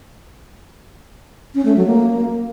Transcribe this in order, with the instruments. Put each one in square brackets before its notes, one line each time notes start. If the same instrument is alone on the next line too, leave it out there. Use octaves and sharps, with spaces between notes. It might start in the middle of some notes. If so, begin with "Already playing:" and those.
[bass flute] C#4
A3
F#3
A#3